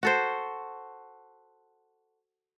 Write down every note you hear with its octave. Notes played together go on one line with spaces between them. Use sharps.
F#4 A4 C5